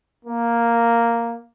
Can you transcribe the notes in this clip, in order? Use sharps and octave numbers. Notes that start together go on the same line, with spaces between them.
A#3